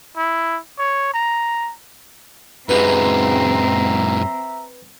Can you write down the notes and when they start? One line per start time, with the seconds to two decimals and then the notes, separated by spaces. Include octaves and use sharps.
0.17 E4
0.79 C#5
1.14 A#5
2.69 F#2 G#3 C4 B4 E5 A#5